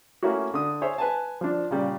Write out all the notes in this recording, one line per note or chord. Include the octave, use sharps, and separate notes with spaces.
A3 A#3 C#4 E4 F#4
D3 D#6
G#4 C5 C#5 E5
B4 G#5 A5
F3 D4
A#2 C#3 G3